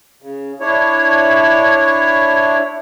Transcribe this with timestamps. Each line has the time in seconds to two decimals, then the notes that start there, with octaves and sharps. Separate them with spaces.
0.22 C#3
0.60 D4 E4 C#5